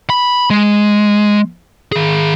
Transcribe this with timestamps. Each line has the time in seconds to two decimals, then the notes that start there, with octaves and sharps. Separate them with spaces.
0.10 B5
0.50 G#3
1.92 D#3 G#4